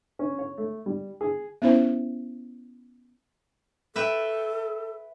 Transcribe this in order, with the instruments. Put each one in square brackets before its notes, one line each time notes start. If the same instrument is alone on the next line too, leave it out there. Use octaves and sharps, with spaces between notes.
[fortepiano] C#4
C#5
A3
G3
G#4
[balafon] B3 C#4 E4 C5
[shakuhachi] A4 [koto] B4 E5 G5